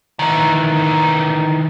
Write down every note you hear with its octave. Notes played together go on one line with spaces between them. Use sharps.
D#3 E3